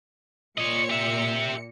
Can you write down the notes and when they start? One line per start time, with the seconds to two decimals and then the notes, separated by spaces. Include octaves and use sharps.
0.58 A#2 C#5 D#5 C#7
0.90 G4 E5